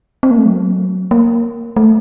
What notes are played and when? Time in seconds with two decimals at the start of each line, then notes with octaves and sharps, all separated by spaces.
0.23 C4
0.31 A#3
0.38 A3
0.46 F#3
1.11 A#3
1.77 A3